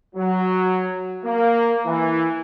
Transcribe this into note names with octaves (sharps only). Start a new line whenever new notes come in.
F#3
A#3
E3